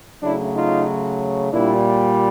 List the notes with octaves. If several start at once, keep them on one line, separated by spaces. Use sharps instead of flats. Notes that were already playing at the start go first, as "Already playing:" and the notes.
C#3 F#3 A3 D4 E4
D#4 F4
A#2 G3 D4 E4